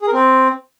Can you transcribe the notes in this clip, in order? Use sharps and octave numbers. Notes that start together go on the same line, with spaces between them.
G#4
A#4
C4